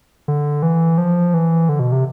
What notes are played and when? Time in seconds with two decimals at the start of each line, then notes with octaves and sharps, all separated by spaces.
0.28 D3
0.63 E3
0.98 F3
1.34 E3
1.69 D3
1.79 B2
1.92 C3